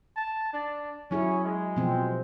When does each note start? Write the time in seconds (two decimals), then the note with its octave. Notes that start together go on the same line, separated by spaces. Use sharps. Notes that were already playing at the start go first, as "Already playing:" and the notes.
0.16 A5
0.53 D4
1.11 F#3 C#4 E4 G#4
1.44 G#3
1.76 B2 F3 C4